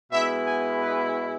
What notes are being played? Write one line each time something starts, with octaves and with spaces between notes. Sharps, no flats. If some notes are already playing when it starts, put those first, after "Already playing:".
B2 G#3 B3 E4 E5
G#5
B4